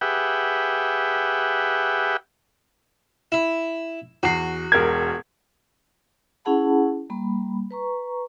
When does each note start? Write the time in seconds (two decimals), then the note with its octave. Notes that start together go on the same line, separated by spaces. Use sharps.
0.01 G4 G#4 B4 E5 F#5 G5
3.32 E4
4.23 E2 F#4 C7
4.72 E1 A#4 G#6
6.45 C#4 E4 G#4 F#5 A5 B5
7.10 G3 A#3 B5
7.71 B4 A#5 C#6